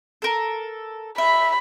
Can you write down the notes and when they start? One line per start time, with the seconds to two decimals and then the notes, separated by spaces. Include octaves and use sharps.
0.22 A4 A#4
1.18 E5 B5